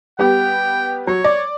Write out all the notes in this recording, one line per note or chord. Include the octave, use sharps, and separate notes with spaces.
G3 B3 G4 G5
F#3 C#5
D5